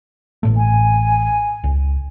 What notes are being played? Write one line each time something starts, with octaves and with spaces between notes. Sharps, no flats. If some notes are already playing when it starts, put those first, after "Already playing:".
A1 A2 A3
G#5
C#2